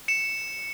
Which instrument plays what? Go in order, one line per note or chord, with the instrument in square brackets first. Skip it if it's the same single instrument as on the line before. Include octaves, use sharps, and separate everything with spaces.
[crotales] C#7 E7